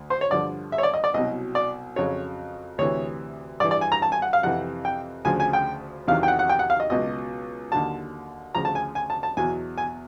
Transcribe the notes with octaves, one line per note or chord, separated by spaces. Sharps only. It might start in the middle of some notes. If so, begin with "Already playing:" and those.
Already playing: D2
C5
C#5
G2 D3 F3 D5
E5
C#5
D5
D#5
D5
C2 B2 F#3 D#5
D5
F2 C#3 F#3 C#5
D2 C3 E3 C#5
G2 E3 D5
D5
G#5
A#5
A5
G#5
F#5
F5
F2 C3 E3 F#5
G5
D2 C#3 F3 G#5
G#5
G5
E2 C3 D#3 F#3 F5
G5
F#5
F#5
G5
F#5
F5
D#5
C#2 B2 F#3 D#5
D#2 D3 F#3 A5
D2 C#3 F3 A#5
A5
G#5
G#5
A5
A5
E2 B2 F#3 G#5
G#5